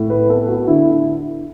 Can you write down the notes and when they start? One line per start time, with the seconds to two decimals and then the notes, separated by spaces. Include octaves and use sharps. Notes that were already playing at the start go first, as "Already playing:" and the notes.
Already playing: A2
0.10 B4
0.29 B3 A4
0.49 F#4
0.67 D3 E4